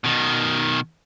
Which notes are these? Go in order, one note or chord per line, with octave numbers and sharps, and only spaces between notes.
B2 D#3